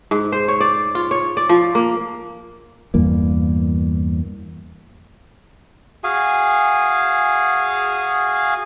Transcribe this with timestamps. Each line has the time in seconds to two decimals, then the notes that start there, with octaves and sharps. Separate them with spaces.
0.11 G#2
0.32 C5
0.48 C#5
0.60 D5
0.95 F4
1.11 C#5
1.37 D5
1.49 F3
1.75 A#3
2.94 E2 G2 E3 A#3
6.04 F#4 G#4 F5 G#5